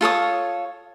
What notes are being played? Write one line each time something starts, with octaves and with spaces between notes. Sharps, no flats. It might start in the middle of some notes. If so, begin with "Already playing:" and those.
F4 A4 C#5 D#6